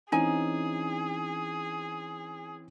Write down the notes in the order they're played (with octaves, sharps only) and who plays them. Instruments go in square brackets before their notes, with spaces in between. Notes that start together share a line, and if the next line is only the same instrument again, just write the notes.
[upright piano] E3 C4 C#4 [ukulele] D#4 G#5 [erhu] G#4